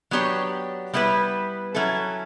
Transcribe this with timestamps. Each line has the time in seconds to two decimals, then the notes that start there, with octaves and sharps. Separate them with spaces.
0.11 F#3 B3 D4 G4 C#5
0.93 G3 B3 E4 B4
1.74 F#3 C#4 E4 A4